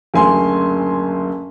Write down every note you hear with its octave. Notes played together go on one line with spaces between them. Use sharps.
F#1 D2 G#5 C6